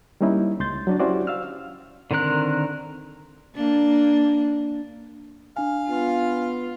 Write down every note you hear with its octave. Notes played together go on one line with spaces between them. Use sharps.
G3 A#3 C#4 D#4 E4
C#2 C6 G6 A6
F#3 D4 F#4
C#4 E4 F#4 G4 C5 D5
F5 E6 F6
D3 D#3 C4 A#4 F#6
A#3 D4
D4 F5 G#5
B3 F4